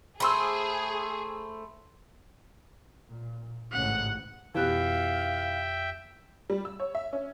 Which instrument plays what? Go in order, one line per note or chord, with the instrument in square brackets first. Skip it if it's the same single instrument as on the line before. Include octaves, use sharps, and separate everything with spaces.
[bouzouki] A3 C5 [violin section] G#4 [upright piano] B5 C6 E6
[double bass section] A#2
[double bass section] A1 G#2 C#3 [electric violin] F#5
[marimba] F2 G4 F#6 [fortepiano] B2 E3 [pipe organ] E5 G5 [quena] F5
[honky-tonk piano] G3
E6
C#5
E5
C#4